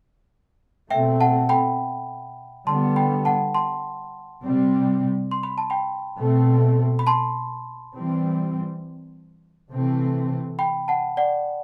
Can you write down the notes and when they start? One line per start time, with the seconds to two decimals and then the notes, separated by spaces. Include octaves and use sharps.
0.90 B2 A3 C4 E5 G5
1.20 F#5 A5
1.49 G5 B5
2.67 D3 G3 B3 A5 C6
2.96 G5 B5
3.25 F#5 A5
3.54 A5 C6
4.42 C3 G3 C4
5.31 C6
5.43 B5
5.58 A5
5.70 G5 B5
6.19 B2 A3 C4
6.99 B5
7.07 A5 C6
7.95 E3 G3 C4
9.71 C3 E3 A3 C4
10.59 G5 B5
10.88 F#5 A5
11.17 D5 F#5